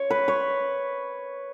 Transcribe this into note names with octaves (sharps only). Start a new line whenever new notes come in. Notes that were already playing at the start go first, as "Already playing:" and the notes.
Already playing: C#5
B4
C#5